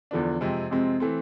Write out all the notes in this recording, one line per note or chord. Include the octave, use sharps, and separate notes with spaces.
E2 D3 F3 B3 D4
F2 C3 G#3 C4
F2 C3 G#3 C4
E3 A3 C4